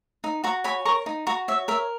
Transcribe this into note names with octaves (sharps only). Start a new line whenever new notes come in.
D#4
F#4 A#5 C#6
C#5 G#5 B5
A#4 A#5 C#6
D#4
F#4 A#5 C#6
C#5 E5
A#4 E5